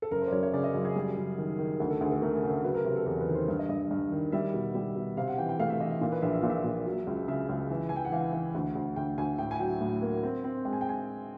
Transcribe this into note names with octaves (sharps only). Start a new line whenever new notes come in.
A4
F#1 A#4
C5
D5
F#2 C#5
C#5
C#3 D5
D#5
F#2
G#4
G3
F#2
D#3
D#3
D2 A4
A4
D2 G#4
A4
A3 A#4
G#4
C#3
A4
F#3 B4
A#4
C3
A4
E2 A#4
B4
D#3
C5
G2
D#5
G2 D#5
D#5
G2
D#3
G3 E5
B2
G3
B2
C3 F5
F#5
E3 G5
G5
A3 F5
E5
E3 D#5
E5
A#2 F5
B4
A#1 E5
E5
A#2 F5
E5
A#2
F#3
C#2
C#3 E5
C#2
E3
E3 G#5
G5
F#5
E3 F5
E3
D2
D2
D2 G5
D2 G#5
A2 G5
G#5
F#3 G5
A2
A#3
C4
C4
G#3 G5
G#5
G5
G#5